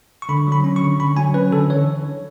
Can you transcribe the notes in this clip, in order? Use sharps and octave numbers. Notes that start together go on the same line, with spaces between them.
C#6
D3 B5
F#3
B5
C#4
C#6
D3
D3 B5
F#3 G#5
C#4 B4
D3 A4
E3 C#5